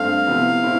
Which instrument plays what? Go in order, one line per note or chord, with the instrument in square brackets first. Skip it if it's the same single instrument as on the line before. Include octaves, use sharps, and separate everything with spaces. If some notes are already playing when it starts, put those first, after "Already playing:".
Already playing: [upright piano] G2 A3 C4 [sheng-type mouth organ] F5
[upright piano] C3 F3 B3 E4
A2 C4 E4